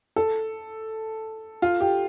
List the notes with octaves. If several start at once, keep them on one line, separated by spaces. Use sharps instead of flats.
A4
F4
G4